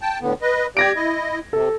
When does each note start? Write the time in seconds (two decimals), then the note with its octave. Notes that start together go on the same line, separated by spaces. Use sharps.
0.01 G5 A5
0.21 A2 D3 B3
0.42 B4 D#5
0.77 G4 D5 G#6 A#6 D7
0.96 E4 D#5
1.53 C3 A4